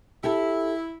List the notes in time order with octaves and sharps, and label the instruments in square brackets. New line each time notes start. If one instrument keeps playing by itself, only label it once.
[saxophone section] E4 [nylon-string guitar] G4 A4